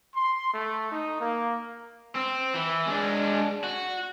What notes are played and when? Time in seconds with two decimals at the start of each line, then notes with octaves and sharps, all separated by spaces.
0.15 C6
0.53 A3
0.90 D#4
1.20 A#3
2.15 C4
2.54 E3
2.86 G#3 D4
3.64 F#4